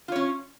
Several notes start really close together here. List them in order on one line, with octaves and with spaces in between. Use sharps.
F4 C#5 C#4